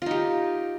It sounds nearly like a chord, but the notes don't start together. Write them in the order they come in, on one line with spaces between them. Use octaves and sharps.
F4 D#4 G4